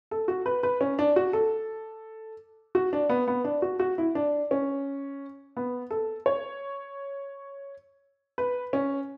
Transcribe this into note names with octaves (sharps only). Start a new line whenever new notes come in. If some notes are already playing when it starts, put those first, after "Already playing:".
A4
F#4
B4
B4
C#4
D4
F#4
A4
F#4
D4
B3
B3
D4
F#4
F#4
E4
D4
C#4
B3
A4
C#5
B4
C#4